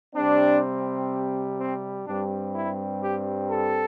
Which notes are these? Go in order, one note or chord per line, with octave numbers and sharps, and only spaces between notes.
C3 G3 C4 D4
C4
G2 G3 C4 D4
E4
G4
A4